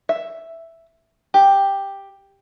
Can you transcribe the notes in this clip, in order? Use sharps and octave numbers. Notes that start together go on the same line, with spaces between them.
E5
G4